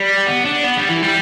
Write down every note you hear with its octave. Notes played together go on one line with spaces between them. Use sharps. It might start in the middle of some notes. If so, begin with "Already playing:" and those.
Already playing: G3
B3
D4
B3
G3
E3
G3